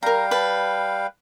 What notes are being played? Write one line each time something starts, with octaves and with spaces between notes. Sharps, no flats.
G3 A#4 F5 G5 A#5
B4 A5